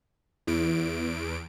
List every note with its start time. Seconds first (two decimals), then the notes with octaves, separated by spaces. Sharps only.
0.47 E2 E4 D7